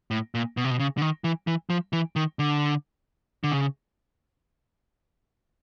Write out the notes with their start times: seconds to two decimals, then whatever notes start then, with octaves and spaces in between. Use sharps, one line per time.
0.11 A2
0.35 A#2
0.57 B2
0.64 C3
0.71 B2
0.79 C#3
0.98 D3
1.02 D#3
1.24 E3
1.47 E3
1.70 F3
1.93 E3
2.16 D#3
2.39 D3
3.44 D3
3.51 C#3